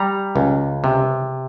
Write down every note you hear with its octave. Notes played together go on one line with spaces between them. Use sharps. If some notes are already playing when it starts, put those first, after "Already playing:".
Already playing: G3 A#5
C#2
C3